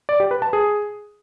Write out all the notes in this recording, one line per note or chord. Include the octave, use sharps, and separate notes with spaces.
D5
G4
B4
A5
G#4